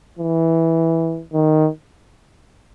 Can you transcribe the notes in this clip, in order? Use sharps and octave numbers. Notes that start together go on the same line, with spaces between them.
E3
D#3